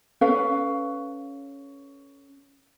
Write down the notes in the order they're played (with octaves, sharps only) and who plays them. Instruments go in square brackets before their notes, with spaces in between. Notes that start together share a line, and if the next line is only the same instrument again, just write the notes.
[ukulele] C#4 A4 B4 F5